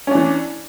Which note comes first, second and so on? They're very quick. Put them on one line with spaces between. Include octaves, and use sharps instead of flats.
C#4 D4 E3